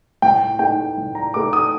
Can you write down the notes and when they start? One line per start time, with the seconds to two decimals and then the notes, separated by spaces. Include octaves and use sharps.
0.22 A2 G5
0.59 A3 D#4 G5
0.97 A2
1.15 A#5
1.34 A3 D#4 D6
1.53 D#6